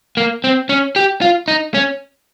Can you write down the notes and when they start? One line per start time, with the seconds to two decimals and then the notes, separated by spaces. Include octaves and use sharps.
0.17 A#3
0.44 C4
0.69 C#4
0.96 G4
1.21 F4
1.48 D#4
1.74 C#4